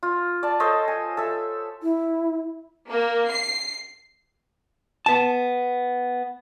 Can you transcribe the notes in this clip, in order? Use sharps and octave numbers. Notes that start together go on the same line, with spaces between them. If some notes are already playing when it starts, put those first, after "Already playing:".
F4
D5 A5
A4 C5 C#5 D#5
G#5
A4 E5
E4
A#3
C7
B3 A5